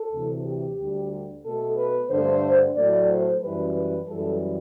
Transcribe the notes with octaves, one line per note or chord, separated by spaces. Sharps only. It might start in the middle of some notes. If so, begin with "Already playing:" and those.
Already playing: A4
D2 C3 E3
G4
D2 D3 G3
B2 A3 A4
B4
G2 D3 A3 C5
A2 F#3 A3 D5
C5
F#2 E3 G3 B4
B4
F#2 E3 G3 A4